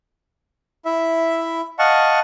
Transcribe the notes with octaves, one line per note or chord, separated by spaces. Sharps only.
E4 E5
D#5 F5 F#5 A5 C#6